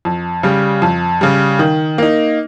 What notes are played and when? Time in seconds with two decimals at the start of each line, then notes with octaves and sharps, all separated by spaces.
0.05 F2
0.43 C#3 G3
0.82 F2
1.21 C#3 G3
1.59 D#3
1.98 A#3 D#4